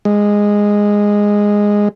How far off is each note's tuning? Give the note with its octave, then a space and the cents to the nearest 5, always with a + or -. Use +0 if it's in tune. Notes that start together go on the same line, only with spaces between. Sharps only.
G#3 -10